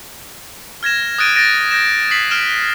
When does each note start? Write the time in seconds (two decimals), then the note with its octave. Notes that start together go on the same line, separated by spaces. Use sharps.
0.83 F6 G#6 A#6 E7
1.18 D#6 F#6 A6 D7 D#7
1.35 A6 A#6 D7 D#7
1.71 G6 A#6 E7
2.11 D#6 B6 C7 F#7
2.31 F6 D7 E7